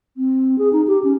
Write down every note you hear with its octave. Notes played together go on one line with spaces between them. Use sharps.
C4
G#4
D#4
G4
C#4